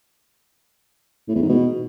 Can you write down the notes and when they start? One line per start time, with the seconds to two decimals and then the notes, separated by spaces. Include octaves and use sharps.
1.29 A2
1.35 E2
1.42 G#2
1.49 B2